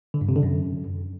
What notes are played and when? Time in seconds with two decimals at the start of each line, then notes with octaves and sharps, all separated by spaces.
0.14 D3
0.21 G2
0.29 C3
0.36 D3
0.43 F#2